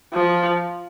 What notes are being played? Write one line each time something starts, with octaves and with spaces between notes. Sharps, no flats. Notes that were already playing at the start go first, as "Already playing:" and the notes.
F3